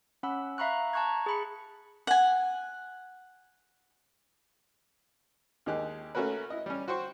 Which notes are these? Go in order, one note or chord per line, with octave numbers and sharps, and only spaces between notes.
C#4 F#5 B5 E6
E5 F5 A#5 B5 C#6 F#6
A5 A#5 C#6 F#6 G#6
G#4 B5 C#7
F#5 G#5
D#2 D#3 G#3 G4 G#4 F#6
A3 A#3 C#4 F#4 A#4 B4
E4 D#5
G3 C#4
F#4 C5 G5 C6 C#6